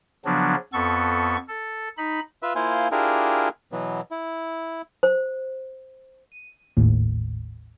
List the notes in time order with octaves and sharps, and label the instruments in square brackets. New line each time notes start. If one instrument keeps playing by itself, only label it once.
[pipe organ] C#3 F3 F#3 B3 D4
F2 B3 A4 C#6
A4
D#4 B5
[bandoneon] F4 B4 E5
A#3 E4 F4 C5 G#5
D4 E4 F4 G4 G#4 A#4
B2 E3 F#3 B3
E4
[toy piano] C5
[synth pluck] D#7
G#1 D#2 A2